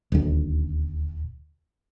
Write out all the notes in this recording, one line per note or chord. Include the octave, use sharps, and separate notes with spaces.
D#1 D2